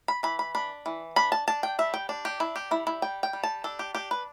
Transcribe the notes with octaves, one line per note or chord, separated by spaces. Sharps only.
B5
E3 B5
B5
D4 B5
E3
D4 B5
A5
D4 A5
G5
G3 E5
G5
D4
G4
D4 E4
G4
G3 E4
E4
G3 G5
G5
G3
A5
D4 A4
G4
D4 G4
B4